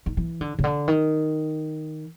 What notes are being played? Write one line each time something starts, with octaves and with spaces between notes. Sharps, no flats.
D#3
E3
D3
C#3
D3
D#3